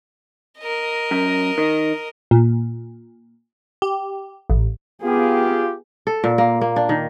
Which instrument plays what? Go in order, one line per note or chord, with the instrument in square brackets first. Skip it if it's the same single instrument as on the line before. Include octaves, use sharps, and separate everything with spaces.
[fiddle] A#4 D#5
[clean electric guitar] F#2
D#3
[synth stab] A#2
G4
A1
[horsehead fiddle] B3 G#4 [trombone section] F4 G4
[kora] A4
A#2
A#3
A#3
D4
D#3